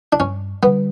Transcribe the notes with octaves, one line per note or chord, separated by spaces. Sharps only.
D4
G2 C#4
D3 G3 B3